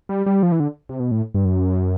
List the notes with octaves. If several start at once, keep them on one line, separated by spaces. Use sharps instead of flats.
G3
G3
F3
E3
D3
C3
B2
A2
G2
F#2